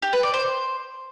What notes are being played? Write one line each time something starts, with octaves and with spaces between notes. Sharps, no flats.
G4
B4
D5
C5